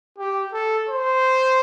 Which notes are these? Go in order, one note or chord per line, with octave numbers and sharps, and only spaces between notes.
G4
A4
C5